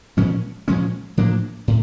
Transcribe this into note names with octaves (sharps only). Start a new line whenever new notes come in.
A#2 F3 G#3 C#4
A#2 F3 G#3 C#4
A2 F3 A#3 D4
A2